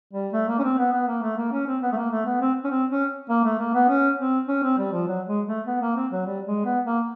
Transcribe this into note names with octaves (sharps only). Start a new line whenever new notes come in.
G3
A3
A#3
C#4
C4
B3
B3
A#3
A3
A#3
C#4
C4
B3
A3
A#3
A3
B3
C4
C#4
C4
C#4
A#3
A3
A#3
B3
C#4
C4
C#4
C4
G3
F3
F#3
G#3
A3
B3
A#3
C4
F#3
G3
G#3
B3
A#3